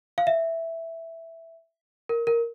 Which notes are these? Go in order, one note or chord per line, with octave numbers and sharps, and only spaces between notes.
F5
E5
A#4
A#4